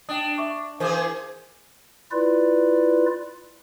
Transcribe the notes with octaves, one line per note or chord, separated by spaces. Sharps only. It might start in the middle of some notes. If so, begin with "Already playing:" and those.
D4 G5 D#6
E5 C#6 D6
E3 G#4 A#4 C5 D6
E4 F4 B4 D5